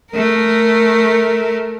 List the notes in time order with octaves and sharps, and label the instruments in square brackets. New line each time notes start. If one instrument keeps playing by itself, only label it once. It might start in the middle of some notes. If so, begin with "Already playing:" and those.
[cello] A3 A#4